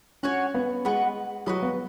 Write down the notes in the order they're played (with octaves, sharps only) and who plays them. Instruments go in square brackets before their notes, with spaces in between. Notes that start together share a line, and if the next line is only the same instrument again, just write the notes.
[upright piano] C#4 [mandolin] F#4 C#5 G#5
[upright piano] B3
[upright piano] G#3 [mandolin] B3 F#4 B4
[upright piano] F#3 [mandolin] F#4 B4 D#5
[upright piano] B3